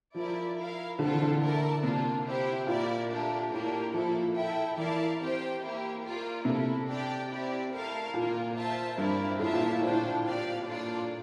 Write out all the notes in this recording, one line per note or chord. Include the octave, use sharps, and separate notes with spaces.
F3 E4 A#4 D5
E4 A#4 F5
D3 C4 F4 A4 C5
E3
D3
A3 E4 A#4 D5 A5
C3 A#3 D4 F4
E4 G4 C5 E5
A#2 E4 A#4 D5
A3 D4 G4 A#4
A2 A#3 D4 G4 A#4
F3 A#3 E4 A4
E4 A4 E5 G5
E3 E4 A#4 D5 F5 A5
C4 G4 C5 G5
A#3 E4 G4
A#3 F4 A#4 D5
C3 A3 E4 A4
D4 G4 D5 G5
C4 E4 G4 D5
A3 E4 A#4 F5 A5
A#2 A#3 F4 A#4
F4 C5 E5 A5
G2 C4 E4 A#4 D5
A2 F4 A#4 E5 A5
A#2
A2
A2 D4 F4 C5 G5
C4 G4 D5 F5
A#3 D4 F4 A4 D5